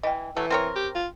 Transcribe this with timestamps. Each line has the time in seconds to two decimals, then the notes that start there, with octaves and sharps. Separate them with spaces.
0.03 E3 D#5 G5
0.37 E3 F#3 A3
0.50 C4 A#4 C#5 G5
0.76 G4
0.95 F4